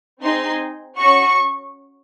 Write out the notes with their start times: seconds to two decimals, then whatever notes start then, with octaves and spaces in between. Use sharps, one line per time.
0.21 C4 D#4 G#4 C6
0.99 C#4 F#4 C#6